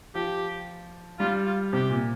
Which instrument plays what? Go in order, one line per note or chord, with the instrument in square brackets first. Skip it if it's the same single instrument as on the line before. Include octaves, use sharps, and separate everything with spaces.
[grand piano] F3 [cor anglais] G4
[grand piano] G3 [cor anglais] F4
[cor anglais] F4
[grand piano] C3 [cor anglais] G4
[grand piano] A#2